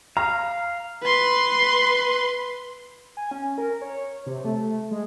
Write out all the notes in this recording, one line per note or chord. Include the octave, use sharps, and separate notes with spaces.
F5 A#5
B4 C6
G#5
C#4
A#4
C#5
C3
A3
G#3